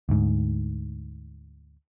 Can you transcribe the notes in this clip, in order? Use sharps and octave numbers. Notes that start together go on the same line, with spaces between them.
D2 G#2